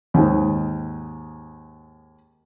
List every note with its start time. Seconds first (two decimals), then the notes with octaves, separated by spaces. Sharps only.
0.14 D#2 G#2